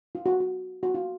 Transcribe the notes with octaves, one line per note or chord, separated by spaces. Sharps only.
F4
F#4
F#4
F#4
F4